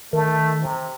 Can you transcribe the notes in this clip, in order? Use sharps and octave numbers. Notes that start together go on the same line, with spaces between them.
D#3 A3
C3